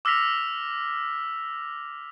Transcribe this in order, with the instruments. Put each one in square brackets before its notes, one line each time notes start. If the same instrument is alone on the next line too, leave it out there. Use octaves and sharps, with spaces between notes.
[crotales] D6 E6 F6 A#6 B6 F7